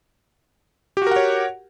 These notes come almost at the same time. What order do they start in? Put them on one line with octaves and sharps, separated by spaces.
G4 F#4 A#4 F#5 C#5